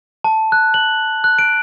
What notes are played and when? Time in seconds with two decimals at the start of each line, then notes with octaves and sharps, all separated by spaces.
0.24 A5
0.52 F#6
0.74 F#7
1.24 F#6
1.39 D7